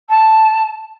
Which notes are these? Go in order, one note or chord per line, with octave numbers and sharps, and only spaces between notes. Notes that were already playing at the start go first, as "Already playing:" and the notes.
A5